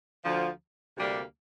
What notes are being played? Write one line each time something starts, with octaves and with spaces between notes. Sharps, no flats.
D2 D3 F3
D2 C3 G3 A#3 D4